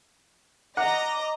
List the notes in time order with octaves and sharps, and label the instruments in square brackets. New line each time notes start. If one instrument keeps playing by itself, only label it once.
[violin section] D#5 A#5 A#6 [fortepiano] F#5 [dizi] D6